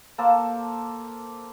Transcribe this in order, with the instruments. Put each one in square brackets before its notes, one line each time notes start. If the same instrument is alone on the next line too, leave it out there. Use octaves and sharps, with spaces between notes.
[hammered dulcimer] A#3 A4 C5 A5